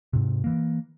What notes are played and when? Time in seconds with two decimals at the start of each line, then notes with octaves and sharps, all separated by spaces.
0.13 G#2 C3
0.44 E3 A#3